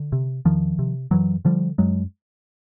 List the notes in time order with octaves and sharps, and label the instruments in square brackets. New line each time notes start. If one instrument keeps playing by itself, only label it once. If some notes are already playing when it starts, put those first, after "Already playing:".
Already playing: [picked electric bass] D3
C3
E2 D#3 F3
C3
F#2 E3 F#3
D3 F3 G3
F#2 F#3 G#3